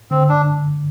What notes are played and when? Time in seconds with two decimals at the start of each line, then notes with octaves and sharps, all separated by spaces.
0.11 D3 C4
0.29 D4